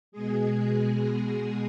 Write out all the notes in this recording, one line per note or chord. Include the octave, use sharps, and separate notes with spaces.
B2 G#3 G#4